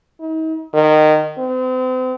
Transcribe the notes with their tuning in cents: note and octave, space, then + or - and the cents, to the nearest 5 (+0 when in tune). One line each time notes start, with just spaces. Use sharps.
D#4 +40
D#3 -20
C4 -40